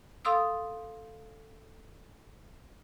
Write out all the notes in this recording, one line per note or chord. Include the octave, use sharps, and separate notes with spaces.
A4 F5 C6 D#6 E6